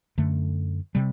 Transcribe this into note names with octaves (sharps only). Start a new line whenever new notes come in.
F#2 D3 A3
C3 G3